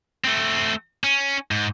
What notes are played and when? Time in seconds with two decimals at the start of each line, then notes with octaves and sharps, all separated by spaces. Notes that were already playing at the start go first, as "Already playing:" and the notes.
0.24 A3 C4
1.04 C#4
1.51 G#2